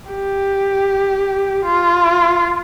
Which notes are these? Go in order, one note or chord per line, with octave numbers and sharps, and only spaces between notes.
G4
F4